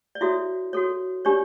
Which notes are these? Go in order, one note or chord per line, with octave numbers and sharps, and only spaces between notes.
D5
E4 F#4 A4 C#5 E5
F#4 A4 C#5
D4 G4 C#5 D5